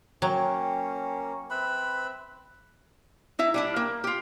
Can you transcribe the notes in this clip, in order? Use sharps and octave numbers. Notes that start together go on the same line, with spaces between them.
F#3 A#3 C#4 G5
C4 B4 E5 B5
D#4 E4 E5
G3 D4 E4
A#3
F4 G4